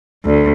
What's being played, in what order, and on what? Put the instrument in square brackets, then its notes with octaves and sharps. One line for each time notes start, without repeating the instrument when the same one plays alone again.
[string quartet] D2